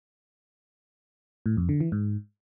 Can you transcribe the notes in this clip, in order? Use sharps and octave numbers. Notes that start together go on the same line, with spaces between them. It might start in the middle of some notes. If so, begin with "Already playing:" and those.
A2
F2
D3
E3
G#2